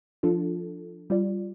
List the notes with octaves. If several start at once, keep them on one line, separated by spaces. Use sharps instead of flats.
F3 D4 F4 A4
G3 F4 D5